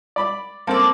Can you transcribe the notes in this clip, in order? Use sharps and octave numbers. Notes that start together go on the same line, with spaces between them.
D5 B5
A#3 C4 A4 D5